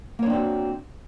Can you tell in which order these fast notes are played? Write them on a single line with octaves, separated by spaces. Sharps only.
A#3 C#5 D4 C4 F#4